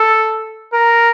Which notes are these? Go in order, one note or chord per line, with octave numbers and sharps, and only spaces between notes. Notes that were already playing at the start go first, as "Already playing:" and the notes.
Already playing: A4
A#4